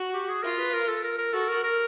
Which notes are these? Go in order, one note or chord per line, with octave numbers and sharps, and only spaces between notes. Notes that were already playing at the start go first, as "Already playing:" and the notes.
Already playing: F#4
G4
G#4
F4 A#4
B4
A#4
A4
A#4
A#4
F#4 A4
A#4
A#4